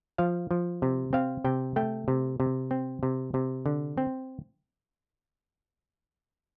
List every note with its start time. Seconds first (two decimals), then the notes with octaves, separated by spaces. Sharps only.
0.18 F3 F5
0.51 F3
0.82 C3
1.13 C4 F5
1.44 C3 G5
1.76 A3 G5
2.08 C3
2.40 C3
2.71 C4
3.03 C3
3.34 C3
3.66 D3
3.98 C4